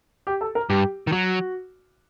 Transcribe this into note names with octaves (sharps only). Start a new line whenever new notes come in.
G4
A4
A#4
G2 G4
D#3
F#3 F#4